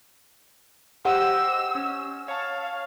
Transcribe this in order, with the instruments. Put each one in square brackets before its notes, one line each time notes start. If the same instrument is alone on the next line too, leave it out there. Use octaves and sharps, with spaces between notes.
[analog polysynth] G4 C5 D#5 [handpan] F#5 [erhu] E6
[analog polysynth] C#4
[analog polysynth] C#5 A5 [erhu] F5